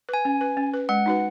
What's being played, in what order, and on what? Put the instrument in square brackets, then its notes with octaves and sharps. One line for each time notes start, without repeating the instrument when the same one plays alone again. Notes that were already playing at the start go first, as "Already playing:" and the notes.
[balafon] B4 [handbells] G#5
[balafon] C#4
B4
C#4
B4
[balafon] G#3 [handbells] F#5
[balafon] D#4 F#4 B4